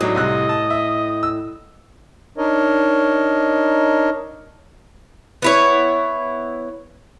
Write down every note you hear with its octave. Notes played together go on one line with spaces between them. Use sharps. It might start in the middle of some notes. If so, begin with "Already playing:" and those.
A2 F#3 D4 D#4 D#5
C2 C3 F#6
A5
E5
E6
D4 D#4 A#4 C#5 D#5
B3 E4 C#5